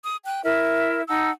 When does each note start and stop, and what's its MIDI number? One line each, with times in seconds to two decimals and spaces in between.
0.04 0.17 87
0.26 0.41 79
0.26 0.41 90
0.43 1.02 64
0.43 1.02 70
0.43 1.02 76
1.08 1.30 63
1.08 1.30 78
1.08 1.30 81
1.08 1.30 88